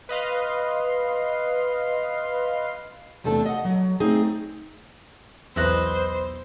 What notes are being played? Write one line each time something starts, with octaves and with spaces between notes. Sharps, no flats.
B4 D#5 F5 C6
E2 C3 A3 D4 A4 A5
D#5 F#5
F#3
A3 C4 D#4 G#4
B1 E2 B4 C5 D#5 E5